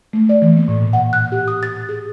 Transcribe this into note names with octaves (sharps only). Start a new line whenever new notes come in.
A3
D5
E3
A#3
A2
A#2
F#5
F#6
G4
D#6
A6
G#4